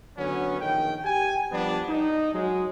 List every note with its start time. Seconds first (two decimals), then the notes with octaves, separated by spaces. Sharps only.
0.17 D3 F#3 B3 C#4
0.60 A#1 D#3 G5
1.04 G4 G5 G#5
1.51 F3 G3 B3 D4
1.87 D#4
2.33 F#3 G#3